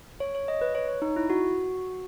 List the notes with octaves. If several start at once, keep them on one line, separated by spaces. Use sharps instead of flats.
C#5
C#5
D#5
B4
C#5
C#5
D#4
E4
F#4